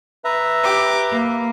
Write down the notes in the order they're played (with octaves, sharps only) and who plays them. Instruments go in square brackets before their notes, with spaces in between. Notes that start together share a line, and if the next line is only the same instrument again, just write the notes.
[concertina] B4 E5 A#5
[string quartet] G4 D6
A#3